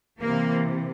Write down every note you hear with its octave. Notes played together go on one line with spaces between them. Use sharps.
C3 E3 A#3